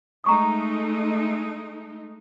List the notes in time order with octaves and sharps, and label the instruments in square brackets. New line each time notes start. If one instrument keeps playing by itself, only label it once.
[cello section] G#3 A3 D#4 [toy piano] A#5 C#6 D#6